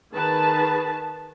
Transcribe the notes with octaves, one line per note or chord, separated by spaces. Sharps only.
D#3 G#4 B4 A5